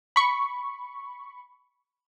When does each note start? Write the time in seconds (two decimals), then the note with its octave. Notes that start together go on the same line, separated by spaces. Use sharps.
0.16 B5 C#6